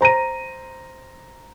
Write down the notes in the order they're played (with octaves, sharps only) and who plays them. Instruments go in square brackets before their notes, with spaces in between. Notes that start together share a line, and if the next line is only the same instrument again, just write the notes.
[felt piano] C5 A#5 A#6 D#7